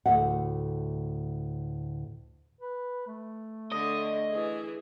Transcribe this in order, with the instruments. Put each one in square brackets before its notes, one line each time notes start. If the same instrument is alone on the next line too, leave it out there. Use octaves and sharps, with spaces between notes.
[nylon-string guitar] D2 A2 C3 E5 F#5
[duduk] B4
A3
[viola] D3 [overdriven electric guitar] D#5
[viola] E3 G#4